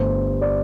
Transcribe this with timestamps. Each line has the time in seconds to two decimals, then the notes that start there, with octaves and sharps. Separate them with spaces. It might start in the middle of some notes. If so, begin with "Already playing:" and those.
Already playing: G1 G2 D3 A3 C5
0.41 D5